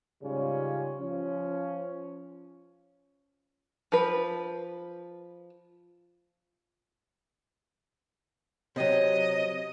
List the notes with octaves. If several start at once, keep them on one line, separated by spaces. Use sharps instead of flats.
G#2 C#3 G3 C#4 F4
F3 C#4
F3 B4
C3 F#3 D#5